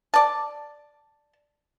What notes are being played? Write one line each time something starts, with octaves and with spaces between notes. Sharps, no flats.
D5 A5